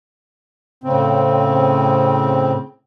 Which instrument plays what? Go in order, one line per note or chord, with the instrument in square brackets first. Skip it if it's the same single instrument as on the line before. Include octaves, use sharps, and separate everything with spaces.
[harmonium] A2 C#3 C4